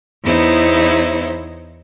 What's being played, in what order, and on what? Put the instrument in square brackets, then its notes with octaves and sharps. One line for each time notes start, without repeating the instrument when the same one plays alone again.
[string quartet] E2 B3 D#4 E4 C5 C#5